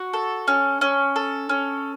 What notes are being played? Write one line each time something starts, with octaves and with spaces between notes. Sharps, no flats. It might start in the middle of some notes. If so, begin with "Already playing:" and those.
Already playing: F#4
A4
C#4
C#4
A4
C#4